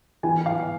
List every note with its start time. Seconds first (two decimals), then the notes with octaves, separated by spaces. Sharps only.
0.23 E3 G#5
0.46 F5